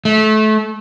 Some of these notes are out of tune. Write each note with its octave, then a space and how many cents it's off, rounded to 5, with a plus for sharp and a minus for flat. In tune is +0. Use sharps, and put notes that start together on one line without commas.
A3 -25